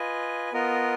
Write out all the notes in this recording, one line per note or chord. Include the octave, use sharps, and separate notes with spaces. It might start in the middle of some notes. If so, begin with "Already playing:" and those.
Already playing: F4 B4 D#5 G#5
B3 F4 A#4 D#5